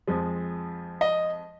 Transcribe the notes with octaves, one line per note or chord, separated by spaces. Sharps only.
F2 F3 G#3
D#5